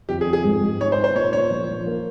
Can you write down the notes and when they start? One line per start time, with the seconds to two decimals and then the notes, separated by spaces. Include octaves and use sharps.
0.09 F2 G4
0.21 G#4
0.26 F2
0.33 G#4
0.45 G#2
0.62 G#2
0.80 D#4 C#5
0.92 C5
0.97 D#4
1.04 C5
1.15 A#2 C#5
1.33 A#2 C#5
1.51 F3
1.69 F3
1.86 A#3